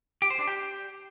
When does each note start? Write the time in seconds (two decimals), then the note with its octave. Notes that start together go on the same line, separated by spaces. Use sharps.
0.22 G4
0.30 C5
0.39 D4
0.47 G4